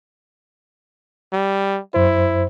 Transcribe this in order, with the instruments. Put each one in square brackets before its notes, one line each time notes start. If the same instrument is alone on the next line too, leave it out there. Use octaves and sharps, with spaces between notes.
[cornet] G3
[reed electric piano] F#2 C5 [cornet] E4